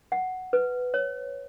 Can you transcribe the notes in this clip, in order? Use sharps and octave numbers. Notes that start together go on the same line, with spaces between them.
F#5
B4
C#5